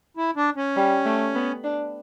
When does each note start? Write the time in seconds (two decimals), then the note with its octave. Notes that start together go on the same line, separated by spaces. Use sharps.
0.17 E4
0.36 D4
0.56 C#4
0.76 G3
1.05 A3
1.35 B3
1.64 D4